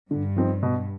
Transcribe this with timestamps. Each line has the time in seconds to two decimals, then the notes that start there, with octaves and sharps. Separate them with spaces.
0.11 G2 D3
0.36 F3 C4 D#4
0.63 B2